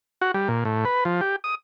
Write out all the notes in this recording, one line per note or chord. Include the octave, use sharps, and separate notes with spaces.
F#4
G3
A#2
A2
B4
F3
G4
D#6